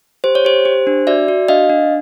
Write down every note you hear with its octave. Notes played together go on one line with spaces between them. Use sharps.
G4 C5
C#5
G4 C5
G4
D4
F#4 D5 E5
F#4
D4 D#5 F5
D4